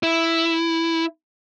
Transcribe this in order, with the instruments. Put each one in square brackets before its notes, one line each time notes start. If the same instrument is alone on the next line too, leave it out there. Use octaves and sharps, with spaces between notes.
[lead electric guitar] E4